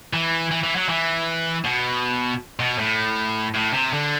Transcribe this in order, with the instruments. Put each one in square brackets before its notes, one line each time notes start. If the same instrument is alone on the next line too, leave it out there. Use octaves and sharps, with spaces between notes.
[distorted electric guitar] E3
E3
E3
F#3
E3
B2
B2
A2
A2
C3
D3